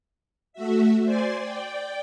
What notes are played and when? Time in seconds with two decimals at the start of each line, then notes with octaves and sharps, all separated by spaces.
0.53 A3 F#4 E5
1.04 C5 D5 G#5 C6
1.37 D5 G5